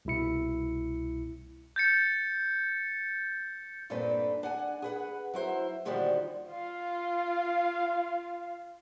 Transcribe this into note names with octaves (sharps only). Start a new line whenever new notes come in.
C2 B2 E4 C#7
G6 A6 C#7
G2 A#2 C4 D4 A4 B4
D4 F#5 G#5
G#4 B4 F#5
F#3 E4 C5
A#2 D3 D#3 F3 G3 F#4
F4 F5